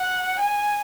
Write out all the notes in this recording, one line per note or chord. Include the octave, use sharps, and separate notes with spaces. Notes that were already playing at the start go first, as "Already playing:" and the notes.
Already playing: F#5
G#5